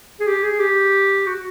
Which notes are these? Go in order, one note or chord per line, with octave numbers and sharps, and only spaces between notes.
G#4
G4
G#4
G4
F#4